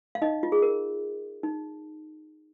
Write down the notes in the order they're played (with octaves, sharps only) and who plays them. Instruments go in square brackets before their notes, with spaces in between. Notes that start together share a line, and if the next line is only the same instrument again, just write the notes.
[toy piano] F5
D#4 D#5
F4
G#4
A#4
D#4